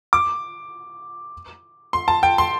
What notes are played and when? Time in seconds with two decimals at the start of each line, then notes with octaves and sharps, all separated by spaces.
0.13 D6
1.93 C6
2.08 A5
2.23 G5
2.38 C6